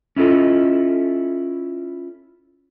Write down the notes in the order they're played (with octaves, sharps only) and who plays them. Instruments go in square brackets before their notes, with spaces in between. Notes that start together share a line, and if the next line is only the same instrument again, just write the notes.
[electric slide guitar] C#4 E4 F4 A4 D#5